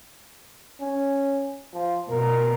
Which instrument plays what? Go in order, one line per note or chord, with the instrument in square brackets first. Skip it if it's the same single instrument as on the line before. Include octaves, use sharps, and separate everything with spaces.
[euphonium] C#4
F3
[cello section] B2 [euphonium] A#4